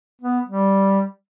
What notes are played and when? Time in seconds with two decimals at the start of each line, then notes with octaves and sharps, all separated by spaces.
0.21 B3
0.46 G3